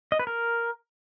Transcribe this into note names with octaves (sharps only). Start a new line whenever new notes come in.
D#5
B4
A#4